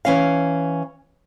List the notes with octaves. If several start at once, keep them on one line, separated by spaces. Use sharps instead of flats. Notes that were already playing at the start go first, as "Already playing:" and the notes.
E3 C#4 F5